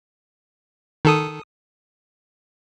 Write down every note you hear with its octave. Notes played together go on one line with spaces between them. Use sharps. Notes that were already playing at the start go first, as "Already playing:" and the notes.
D#3 A4 D#6